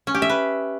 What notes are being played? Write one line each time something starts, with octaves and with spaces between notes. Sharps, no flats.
C#4
G4
E5
B4